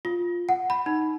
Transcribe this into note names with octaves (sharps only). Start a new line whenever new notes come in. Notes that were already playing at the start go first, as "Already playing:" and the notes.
F4
F#5
B5
D#4